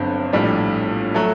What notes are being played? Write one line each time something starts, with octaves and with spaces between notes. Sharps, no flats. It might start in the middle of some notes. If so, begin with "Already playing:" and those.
Already playing: G1 G2 D3 F#3 C4
A#1 A2 G3 D4
F#3 A3